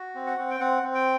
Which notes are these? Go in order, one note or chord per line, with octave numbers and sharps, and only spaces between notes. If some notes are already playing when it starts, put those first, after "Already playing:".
Already playing: F#4
C4
F#5
C4
G5
C4 F#5
C4
G5